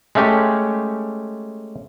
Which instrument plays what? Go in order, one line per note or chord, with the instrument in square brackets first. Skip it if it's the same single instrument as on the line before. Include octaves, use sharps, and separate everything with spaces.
[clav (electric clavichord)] G#3 A3 C#4 G4